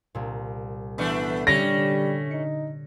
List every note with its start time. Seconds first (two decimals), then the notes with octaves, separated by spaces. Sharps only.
0.15 C2 A#2
0.98 E3 A3 B3 D4
1.47 D3 G3 A3 C#4 G4 C#5 A#6
2.31 D#4 C#7